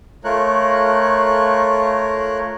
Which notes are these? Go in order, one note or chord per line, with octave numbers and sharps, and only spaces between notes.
A3 F4 A#4 C#5 F#6